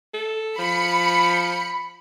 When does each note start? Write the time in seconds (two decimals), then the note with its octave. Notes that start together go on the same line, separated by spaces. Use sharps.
0.14 A4
0.58 F3 B5 C#7